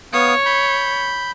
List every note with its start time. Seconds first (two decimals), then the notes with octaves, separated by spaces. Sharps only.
0.13 B3 C#5 F5 D#6
0.46 B5 G6